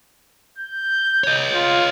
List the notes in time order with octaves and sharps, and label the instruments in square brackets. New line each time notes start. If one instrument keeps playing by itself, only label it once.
[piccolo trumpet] G6
[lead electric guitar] C#5 D#5
[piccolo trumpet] F4